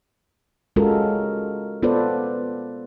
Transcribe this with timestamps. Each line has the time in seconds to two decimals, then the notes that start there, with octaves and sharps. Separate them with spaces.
0.76 G#3 C#4 F4 F#4 A4 A#4
1.83 B3 F4 A4 B4 C5 D5